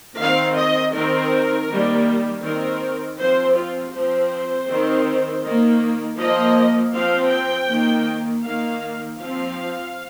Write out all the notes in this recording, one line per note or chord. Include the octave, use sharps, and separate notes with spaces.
D#3 C4 F5
D#5
D#3 C4 A#4
D#3 G3 A#3
D#3 C4 A#4
F3 C4 C5
F4
F3 C4 C5
D#3 C4
D#3 A#3
F3 A#3 D#5
F3 C4 F5
G5
D#3 A#3
D#3 A#3 F5
F3 C4 F5